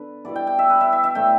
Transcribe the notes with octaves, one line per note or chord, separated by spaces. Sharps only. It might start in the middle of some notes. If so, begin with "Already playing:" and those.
Already playing: D3 B3 B4
B2 G3 B3 E4 D5
G5
G5
E5
B4
E5
E5
E5
A2 A3 D4 G5